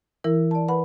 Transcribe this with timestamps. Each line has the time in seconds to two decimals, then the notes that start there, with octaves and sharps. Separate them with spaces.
0.24 E3 E4 A#4
0.51 D5 A5
0.68 B4 F#5 B5